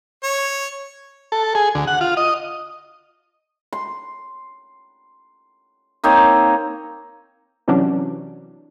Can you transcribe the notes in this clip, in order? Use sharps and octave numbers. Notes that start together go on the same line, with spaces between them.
C#5
A4
G#4
D2
F#5
F4
D#5
C6
A#3 C4 D#4 C#5
C3 E3 F#3 C#4 D4